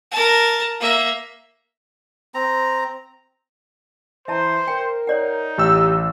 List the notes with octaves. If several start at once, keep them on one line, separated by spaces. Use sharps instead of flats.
A#4 A5
A#3 E5
C4 A#5
E3 C5 E5 A5 A#5
A#4 G5
D#4 C#5 D5 F#5
A1 G4 E6